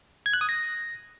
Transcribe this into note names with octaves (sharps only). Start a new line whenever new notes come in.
G#6
F#6
D#6
A#6